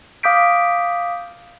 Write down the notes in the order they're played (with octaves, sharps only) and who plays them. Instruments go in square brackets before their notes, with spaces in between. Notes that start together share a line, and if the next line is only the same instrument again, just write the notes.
[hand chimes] F5 D6 D#6 G6 B6 D7